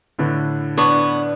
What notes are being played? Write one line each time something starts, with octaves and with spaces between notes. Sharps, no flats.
A2 D3 B4
B3 D4 C#5